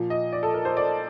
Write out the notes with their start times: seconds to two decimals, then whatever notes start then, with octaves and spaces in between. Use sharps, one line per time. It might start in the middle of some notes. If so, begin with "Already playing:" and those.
Already playing: A#2 F3
0.10 D#5
0.32 D5
0.43 A4
0.54 A#4
0.65 C5
0.77 D5